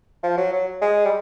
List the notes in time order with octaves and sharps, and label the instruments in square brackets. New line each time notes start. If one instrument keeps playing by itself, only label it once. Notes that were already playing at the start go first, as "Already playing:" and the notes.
[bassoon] F3
F#3
F#3
G#3
G3